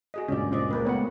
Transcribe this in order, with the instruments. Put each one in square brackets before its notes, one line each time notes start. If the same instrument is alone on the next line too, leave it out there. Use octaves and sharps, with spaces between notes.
[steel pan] F#4 G#4 D#5
[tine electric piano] C#2 G2 A#2 [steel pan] C#4 D5
[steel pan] C4 D5 D#5
G#3 A#3 B4
[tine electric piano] C#2 B4 F#5 [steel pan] A3 B3 C#5